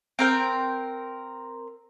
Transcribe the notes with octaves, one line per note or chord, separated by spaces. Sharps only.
C4 A#4 G5